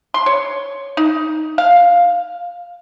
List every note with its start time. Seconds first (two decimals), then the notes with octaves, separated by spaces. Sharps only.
0.14 C6
0.26 C#5
0.97 D#4
1.58 F5